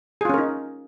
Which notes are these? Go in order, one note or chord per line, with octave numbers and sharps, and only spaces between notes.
C#4 D#4 F4 G#4 A#4